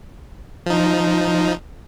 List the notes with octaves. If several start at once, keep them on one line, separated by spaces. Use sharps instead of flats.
F3 D#4